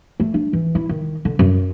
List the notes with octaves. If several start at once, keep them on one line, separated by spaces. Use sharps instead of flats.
A3
D4
E3
E4
D#3
D3
F#2